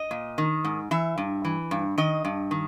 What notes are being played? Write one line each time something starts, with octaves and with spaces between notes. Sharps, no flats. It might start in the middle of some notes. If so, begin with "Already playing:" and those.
Already playing: D#5
A#2
D#3
G#2
E3 E5
G2
E3
G2
D#3 D#5
G2
D#3